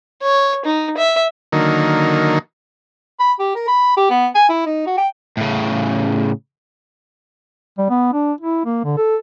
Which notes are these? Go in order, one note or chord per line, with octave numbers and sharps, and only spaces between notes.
C#5
D#4
E5
D3 D#3 F#3 A#3 D#4
B5
G4
A#4
B5
G4
B3
G#5
E4
D#4
F#4
G5
A2 C#3
G3
B3
D4
E4
A#3
D3
A4